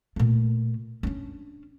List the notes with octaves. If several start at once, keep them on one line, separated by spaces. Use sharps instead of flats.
A#2 A3
C#4 D4